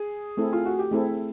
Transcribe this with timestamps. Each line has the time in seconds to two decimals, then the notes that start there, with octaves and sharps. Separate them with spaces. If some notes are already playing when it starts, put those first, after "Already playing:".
Already playing: G#4
0.37 A3 C4 E4 A4
0.53 F4
0.65 F#4
0.79 G4
0.91 A3 C4 E4 G#4 A4